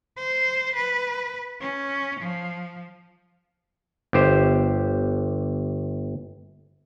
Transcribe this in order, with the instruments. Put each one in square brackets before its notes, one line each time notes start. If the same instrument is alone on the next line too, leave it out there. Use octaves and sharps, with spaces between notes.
[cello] C5
B4
C#4
F3
[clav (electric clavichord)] G1 G4 C5